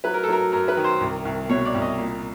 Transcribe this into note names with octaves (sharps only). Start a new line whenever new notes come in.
F#3 B4
A#4
A4
F#3 A#4
F#2 A#4
B4
D#3
C5
C2
C2
B2 C#5
D5
C2
D#5
A#2